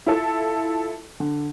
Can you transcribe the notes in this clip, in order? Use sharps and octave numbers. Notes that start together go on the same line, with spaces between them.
E4 F4 A4
D3